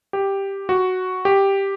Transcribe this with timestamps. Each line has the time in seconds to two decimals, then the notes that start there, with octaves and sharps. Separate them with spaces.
0.13 G4
0.69 F#4
1.25 G4